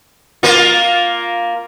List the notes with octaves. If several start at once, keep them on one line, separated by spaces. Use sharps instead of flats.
A#3 F4